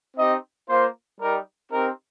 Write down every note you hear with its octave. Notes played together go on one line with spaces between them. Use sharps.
C4 D#4 G4 D#5
A#3 F4 C5
G3 D#4 G4 A#4
C4 D#4 G4 A#4